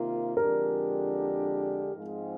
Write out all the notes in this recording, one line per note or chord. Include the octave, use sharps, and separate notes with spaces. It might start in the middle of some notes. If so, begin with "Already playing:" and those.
Already playing: C3 D#3 A#3 F4
F2 D3 G#3 D4 G4 A#4
G#2 F3 G#3 C4 F4